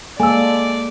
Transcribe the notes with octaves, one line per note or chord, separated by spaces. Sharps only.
G#3 A#3 A4 D5 G#5 E6